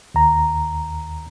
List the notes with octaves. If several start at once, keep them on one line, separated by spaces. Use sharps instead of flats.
D#2 A#5